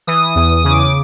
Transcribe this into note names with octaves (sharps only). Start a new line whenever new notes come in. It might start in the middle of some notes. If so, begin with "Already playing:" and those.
E3 D#6
D#6
E2
D#6
C#3
D6